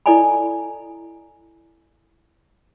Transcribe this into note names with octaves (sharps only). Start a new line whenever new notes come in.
E4 A4 D5 D#5 G#5 B5